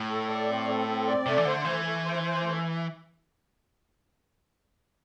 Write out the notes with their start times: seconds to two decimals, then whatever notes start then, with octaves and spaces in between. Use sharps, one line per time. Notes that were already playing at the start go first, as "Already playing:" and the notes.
Already playing: A2
0.10 A4
0.29 D5
0.49 C4
0.68 A4
0.87 C4
1.07 D5
1.26 C3 A3
1.38 E3
1.45 D3 C5
1.65 E3 A3
1.85 A3
2.04 C5
2.23 C5
2.43 A3